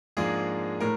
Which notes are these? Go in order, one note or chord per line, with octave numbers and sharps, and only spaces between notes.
G#2 F3 G#3 A#3 D4 G#4
A2 A#4